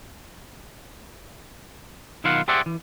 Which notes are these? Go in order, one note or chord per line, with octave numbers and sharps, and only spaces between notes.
B1 D#3 E4 F4 F5 F#5
G4 G#4 C5 D5 E5 F#5
E3